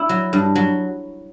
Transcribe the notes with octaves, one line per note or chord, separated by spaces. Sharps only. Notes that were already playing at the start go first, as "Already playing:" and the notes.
Already playing: E4
F#3
G2
F#3